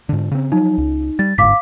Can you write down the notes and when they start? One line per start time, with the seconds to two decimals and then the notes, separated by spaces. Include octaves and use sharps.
0.09 G#2 D3
0.31 C#3 C4
0.52 F3 F#3 D#4
0.78 C#2
1.19 G3 A6
1.38 G1 D2 G#2 F5 D6 B6